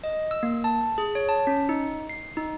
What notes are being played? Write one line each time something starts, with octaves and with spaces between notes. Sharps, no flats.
D#5
E6
A#3
A5
G#4
C#5
A5
C#4
D#4
C7
D#4